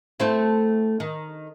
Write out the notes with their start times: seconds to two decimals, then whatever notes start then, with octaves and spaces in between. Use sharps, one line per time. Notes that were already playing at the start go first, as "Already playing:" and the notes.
0.20 A3 C4 E4
1.00 D#3